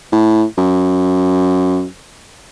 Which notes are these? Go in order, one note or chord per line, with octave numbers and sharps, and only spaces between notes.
A2
F#2